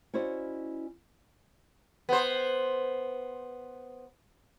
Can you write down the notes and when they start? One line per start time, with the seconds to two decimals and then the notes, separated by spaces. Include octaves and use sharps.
0.13 C#4 E4 F#4 C5 D5 D#5
2.09 B3 C5